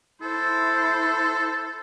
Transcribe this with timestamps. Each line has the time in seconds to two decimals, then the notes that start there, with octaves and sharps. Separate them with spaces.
0.22 E4 A4 C5